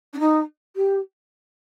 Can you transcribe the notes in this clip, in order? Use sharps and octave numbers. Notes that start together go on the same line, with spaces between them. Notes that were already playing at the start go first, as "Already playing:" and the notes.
D4
D#4
G4